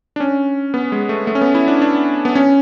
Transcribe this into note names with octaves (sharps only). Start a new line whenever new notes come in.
D4
C#4
B3
G#3
A3
A3
C#4
B3
E4
D4
D4
B3
C#4